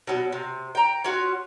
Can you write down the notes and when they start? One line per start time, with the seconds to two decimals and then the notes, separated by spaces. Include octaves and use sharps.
0.07 B2 F#3
0.32 C3
0.75 G5 A#5
1.04 C#4 F4 F#4